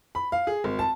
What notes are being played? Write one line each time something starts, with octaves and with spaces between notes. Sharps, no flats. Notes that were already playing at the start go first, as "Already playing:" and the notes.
B5
F5
G#4
G#1
A5